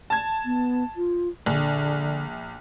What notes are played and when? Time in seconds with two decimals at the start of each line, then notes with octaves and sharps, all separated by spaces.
0.10 A5 G#6
0.45 B3
0.97 F4
1.46 A#1 D3